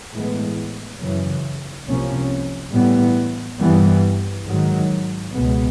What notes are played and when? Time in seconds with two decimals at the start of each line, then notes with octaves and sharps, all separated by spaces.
0.13 A2 E3 G#3 B3
0.99 F#2 C#3 E3
1.86 C2 C3 F3 A#3 C#4
2.72 A2 E3 G3 B3
3.59 G2 E3 G3 B3
4.46 G#2 D#3 F#3
5.33 C#2 B2 G#3 B3